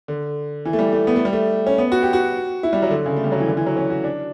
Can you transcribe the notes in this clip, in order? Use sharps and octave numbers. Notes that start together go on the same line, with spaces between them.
D3
E3
A3
G3
A3
B3
A3
G3
A3
C#4
B3
F#4
G4
F#4
E4
G3
F#3
D3
C#3
A3
G3
F#3
E3
D3
E3
F#3
C#4
F#4
D4